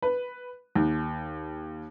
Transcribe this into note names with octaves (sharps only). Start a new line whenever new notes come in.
B4
D#2